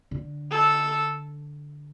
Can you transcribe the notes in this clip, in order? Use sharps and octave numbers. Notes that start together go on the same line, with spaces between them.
D3
A4